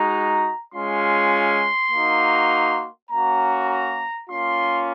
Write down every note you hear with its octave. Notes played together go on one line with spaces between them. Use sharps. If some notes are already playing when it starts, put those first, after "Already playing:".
Already playing: G#3 D#4 F#4 A#5
G#3 C#4 F4 C6
A#3 D#4 F#4
A#3 C#4 F#4 A#5
A#5
A#3 C#4 F4 C6